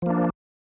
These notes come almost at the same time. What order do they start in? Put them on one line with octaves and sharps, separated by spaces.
F3 A#3 D4